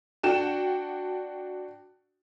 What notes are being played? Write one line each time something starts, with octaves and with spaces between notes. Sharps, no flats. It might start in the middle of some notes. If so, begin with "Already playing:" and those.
D4 F#4 G5 E7